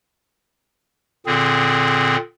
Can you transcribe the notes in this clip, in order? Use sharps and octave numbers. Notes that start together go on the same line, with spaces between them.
A#2 D3 C4 G#4